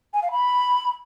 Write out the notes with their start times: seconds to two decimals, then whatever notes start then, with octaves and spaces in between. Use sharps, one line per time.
0.14 G#5
0.23 F5
0.32 B5